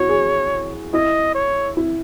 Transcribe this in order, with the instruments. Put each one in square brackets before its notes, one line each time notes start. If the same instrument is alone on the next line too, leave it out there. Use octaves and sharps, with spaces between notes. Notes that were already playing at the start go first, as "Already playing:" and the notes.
Already playing: [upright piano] E4 F#4 [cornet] C#5
[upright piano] G#4
[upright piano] E4 [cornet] D#5
[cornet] C#5
[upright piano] E4